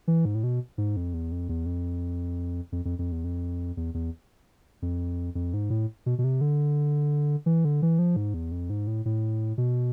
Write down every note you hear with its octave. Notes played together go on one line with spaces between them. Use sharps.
E3
G#2
A2
B2
G#2
F2
E2
F2
E2
F2
F2
F2
F2
E2
F2
E2
E2
F2
F2
G#2
A2
B2
B2
C3
D3
E3
D3
E3
F3
G#2
E2
F2
G#2
A2
A2
B2